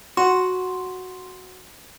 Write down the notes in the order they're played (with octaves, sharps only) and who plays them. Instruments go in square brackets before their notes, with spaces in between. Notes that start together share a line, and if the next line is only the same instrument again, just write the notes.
[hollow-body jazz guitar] F#4 [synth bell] C6